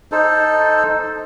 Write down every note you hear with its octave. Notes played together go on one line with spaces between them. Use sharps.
D#4 A4 C5